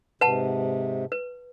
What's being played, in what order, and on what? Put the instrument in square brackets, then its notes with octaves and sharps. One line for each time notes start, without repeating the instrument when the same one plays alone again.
[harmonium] G#2 C3 [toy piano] B4 F#5 A5
[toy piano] B4